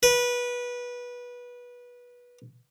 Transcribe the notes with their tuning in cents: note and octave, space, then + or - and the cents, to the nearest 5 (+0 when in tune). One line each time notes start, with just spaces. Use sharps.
B4 -20